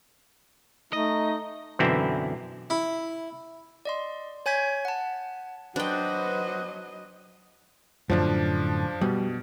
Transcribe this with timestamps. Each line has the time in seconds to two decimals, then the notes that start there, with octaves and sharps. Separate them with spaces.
0.93 A3 D#4 D#5
1.79 F#2 B2 D3 E3 C4 E4
2.70 E4
3.85 D5 D#5 C6
4.46 C#5 G#5 G6 G#6 B6
4.85 F#5 A5
5.76 F#3 D4 F#4 B4 C5 D#5 F#5 G5
8.10 F#2 A2 D3 F3 D4
9.01 B2 G3